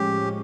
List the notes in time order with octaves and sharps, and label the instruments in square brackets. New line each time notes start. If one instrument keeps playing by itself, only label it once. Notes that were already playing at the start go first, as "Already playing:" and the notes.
Already playing: [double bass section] A2 F3 G#3 C#4 [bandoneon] G4